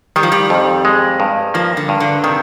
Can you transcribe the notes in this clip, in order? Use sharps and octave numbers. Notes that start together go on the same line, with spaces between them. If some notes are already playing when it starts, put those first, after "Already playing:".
D#3 G3
F3
G3
F2
G#3
G2
F3 A#3
D3
G2
D3
C3 D#3